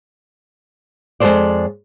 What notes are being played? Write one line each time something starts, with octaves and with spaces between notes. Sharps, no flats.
F2 G#3 G#4 A4 C5 D5